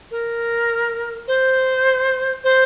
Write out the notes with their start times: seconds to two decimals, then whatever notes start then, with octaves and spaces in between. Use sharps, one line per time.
0.11 A#4
1.28 C5
2.44 C5